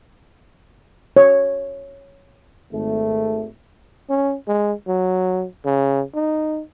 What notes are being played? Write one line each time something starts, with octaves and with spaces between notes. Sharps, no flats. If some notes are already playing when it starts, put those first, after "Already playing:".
C#5
G#1 A3
C#4
G#3
F#3
C#3
D#4